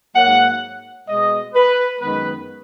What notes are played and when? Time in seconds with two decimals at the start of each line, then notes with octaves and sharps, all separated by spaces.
0.14 G#2 F#3 A#3 F#5
1.07 B2 G#3 B3 D#5
1.54 B4
1.99 F#2 D#3 G#3 B3 B4